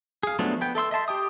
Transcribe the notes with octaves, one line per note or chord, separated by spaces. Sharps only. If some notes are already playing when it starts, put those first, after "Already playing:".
G#4 F5
F3 F#3 A3 B3 D4
B3 G5
A4 E5 C6 E6
D#5 E5 A5 C6
G4 G5 D#6